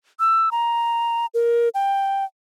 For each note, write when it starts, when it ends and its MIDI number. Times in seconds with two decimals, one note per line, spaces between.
0.20 0.49 88
0.52 1.26 82
1.34 1.69 70
1.74 2.24 79